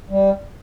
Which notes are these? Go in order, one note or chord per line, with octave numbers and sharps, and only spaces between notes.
G3